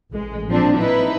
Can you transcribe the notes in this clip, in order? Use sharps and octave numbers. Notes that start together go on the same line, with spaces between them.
A1 G#3
A#2 F3 C4 D4
D#4 E4 B4